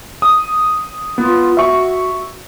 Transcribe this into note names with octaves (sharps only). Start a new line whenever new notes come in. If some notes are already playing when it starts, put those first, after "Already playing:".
D#6
B3 F4
F#4 E5 C#6